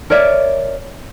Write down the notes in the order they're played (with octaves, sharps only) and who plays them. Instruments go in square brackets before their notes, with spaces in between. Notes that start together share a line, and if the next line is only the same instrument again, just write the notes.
[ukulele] A#4 C#5 D5 E5